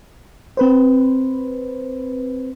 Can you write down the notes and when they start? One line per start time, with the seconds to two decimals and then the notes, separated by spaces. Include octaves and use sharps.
0.57 C4 B4 C5